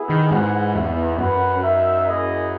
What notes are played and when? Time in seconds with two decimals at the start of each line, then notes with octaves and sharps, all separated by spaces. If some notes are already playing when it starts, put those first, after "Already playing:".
Already playing: B3 E4 G#4
0.09 D#3
0.31 G#2 E4 G#4 B4 F#5
0.74 E2 B3 D#4 G#4 C#5 E5
1.18 F#2 F#4 B4 F#5
1.62 D#4 A#4 E5
2.05 A#3 E4 G#4 D#5